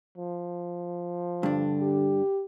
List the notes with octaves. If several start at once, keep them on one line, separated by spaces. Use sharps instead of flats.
F3
G2 D3 D4
G4